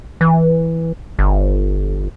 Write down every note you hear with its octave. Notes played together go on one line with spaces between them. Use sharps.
E3
G1